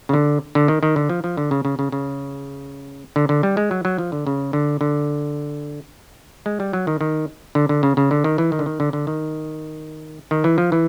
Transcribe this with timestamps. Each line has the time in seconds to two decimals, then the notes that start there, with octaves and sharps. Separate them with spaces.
0.09 C#3
0.13 D3
0.55 D3
0.68 D#3
0.83 D#3
0.96 D3
1.09 F3
1.24 F3
1.37 D3
1.51 C#3
1.65 C#3
1.79 C#3
1.92 C#3
3.16 D3
3.29 D3
3.43 G3
3.57 G#3
3.71 F#3
3.85 F#3
3.98 F3
4.12 D3
4.27 C#3
4.53 D3
4.81 D3
6.46 G#3
6.60 G3
6.73 F#3
6.87 D#3
7.01 D#3
7.55 D3
7.69 D3
7.83 C#3
7.97 C#3
8.11 D3
8.24 D#3
8.38 E3
8.52 D#3
8.59 D3
8.66 D#3
8.80 D3
8.93 D3
9.07 D#3
10.31 D#3
10.44 E3
10.58 F3
10.72 E3